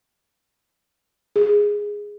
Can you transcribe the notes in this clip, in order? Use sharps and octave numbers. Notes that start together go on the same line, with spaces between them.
G#4